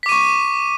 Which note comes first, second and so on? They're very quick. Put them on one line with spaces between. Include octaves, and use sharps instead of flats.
B6 D6 D#7 C#6